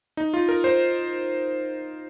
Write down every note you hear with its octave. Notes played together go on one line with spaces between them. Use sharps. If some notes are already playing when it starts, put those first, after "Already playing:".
D#4
F4
A#4
C5